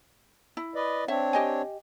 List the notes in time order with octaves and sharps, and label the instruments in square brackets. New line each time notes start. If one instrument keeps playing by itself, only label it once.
[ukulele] E4
[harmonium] B4 D5 D#5
[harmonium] C4 D4 C#5 [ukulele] E5
[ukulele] G4 D#5 G#5